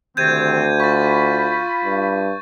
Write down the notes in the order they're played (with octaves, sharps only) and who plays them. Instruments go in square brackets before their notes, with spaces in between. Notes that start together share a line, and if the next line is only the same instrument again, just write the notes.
[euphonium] D2 [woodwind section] C3 D#3 C4 [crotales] G6 G#6 D#7
[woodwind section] F4 B5 [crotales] C#6 G#6 A6
[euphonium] G2